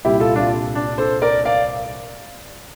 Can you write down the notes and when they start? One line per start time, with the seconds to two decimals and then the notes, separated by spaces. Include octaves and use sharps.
0.05 C2 A#2 G3 E4 G4
0.20 F4 A4
0.36 D4 F4
0.75 D4
0.98 A4 C5
1.22 A#4 D5
1.45 D5 F5